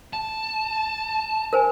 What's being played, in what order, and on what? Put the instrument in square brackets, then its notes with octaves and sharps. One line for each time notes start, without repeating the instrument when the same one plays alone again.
[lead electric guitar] A5
[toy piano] A#4 C5 G#5